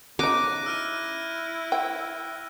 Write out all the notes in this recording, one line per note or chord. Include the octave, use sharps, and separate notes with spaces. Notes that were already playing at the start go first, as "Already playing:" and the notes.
C#3 D#4 D6 F#6 A#6 D#7
E4 E6 F6 D#7
G5